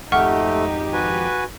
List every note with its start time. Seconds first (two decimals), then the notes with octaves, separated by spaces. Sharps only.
0.12 G#1 F2 A3 D#4 G4 F#5 C#6 F6
0.93 F#4 B4 G#5